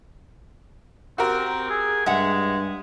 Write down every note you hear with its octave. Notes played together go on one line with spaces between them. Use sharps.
C4 F#4 G4 A#4
G#4
G2 G#3 E5 F#5